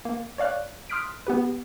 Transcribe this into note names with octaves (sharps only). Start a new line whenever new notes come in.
A#3
C#5 D5 F5 F#6
C6 D#6 F6 F#6 B6 D7
B3 G4 B4